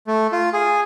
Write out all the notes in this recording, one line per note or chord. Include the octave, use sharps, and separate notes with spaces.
A3
F4
G#4